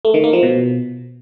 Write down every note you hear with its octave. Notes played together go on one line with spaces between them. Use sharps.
A3
D#3
A#3
F3
B2